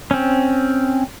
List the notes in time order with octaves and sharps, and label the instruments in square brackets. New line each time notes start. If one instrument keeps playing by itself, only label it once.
[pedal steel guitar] C4 C#4